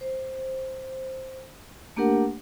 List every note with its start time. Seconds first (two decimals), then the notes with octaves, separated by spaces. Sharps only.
0.01 C5
1.96 A3 A#3 D4 G4 A#4 F#5